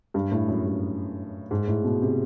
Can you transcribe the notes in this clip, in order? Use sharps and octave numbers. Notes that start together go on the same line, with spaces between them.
G2
A2
F#2
G2
G#2
A2
B2
C3